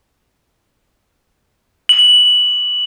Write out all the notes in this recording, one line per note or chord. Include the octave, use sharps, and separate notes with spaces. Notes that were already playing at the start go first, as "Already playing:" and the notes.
F#7